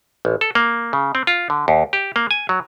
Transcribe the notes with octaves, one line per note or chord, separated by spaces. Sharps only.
A1
A4
A#3
C#3
C4
F4
D3
D#2
G4
A#3
G#5
F#3